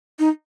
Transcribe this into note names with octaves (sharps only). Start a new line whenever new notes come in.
D#4